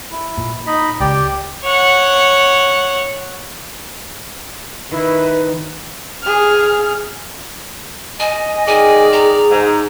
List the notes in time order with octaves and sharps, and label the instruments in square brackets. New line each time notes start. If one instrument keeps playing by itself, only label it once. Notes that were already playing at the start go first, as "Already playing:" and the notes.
[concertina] E4
[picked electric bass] A#2
[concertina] D#4 D#5 B5
[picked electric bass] C#2 [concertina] G4 D5 G5
[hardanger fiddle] C#5 F#5
[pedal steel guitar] D#3 [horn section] E4 [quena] B4
[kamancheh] G#4 F6
[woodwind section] D#5 [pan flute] G#5
[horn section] D#3 A#4 D5 [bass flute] G#4 [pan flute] G#5
[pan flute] A#5
[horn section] G#2